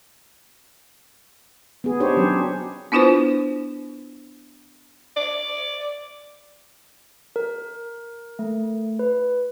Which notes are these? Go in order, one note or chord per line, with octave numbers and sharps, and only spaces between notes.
B3 G#4
D4 D#4 G4 G#4 C5 C#5
F#3 C#4
B3 D4 E4 F4 B4 C5
D5
A#4
A3
B4